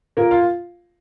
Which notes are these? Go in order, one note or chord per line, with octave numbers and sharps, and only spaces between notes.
A#2 A#3 A#4
F4 F5